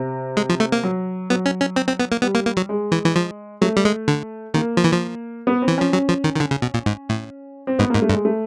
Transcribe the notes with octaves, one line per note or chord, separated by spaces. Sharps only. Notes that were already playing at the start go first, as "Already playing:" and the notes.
Already playing: C3
G#3
F3
A3
A#3
F#3
F#3 B3
C#4
C#4
C4
C4
B3
A#3
G3 B3
A#3
A#3
F#3
G#3
E3
E3
F3
F#3 A3
G3
G#3
D3
D#3 A#3
F3
E3
F3
B3
C4
E3
F3 C#4
F#3 C#4
F3
D#3
D#3
D3
C#3
B2
A#2
G#2
A2
C4
G#2 B3
G#2 A#3
A3
G2
G#3
A3